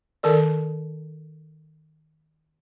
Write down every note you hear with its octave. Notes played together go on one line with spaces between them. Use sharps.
D#3 A4 A#4 D5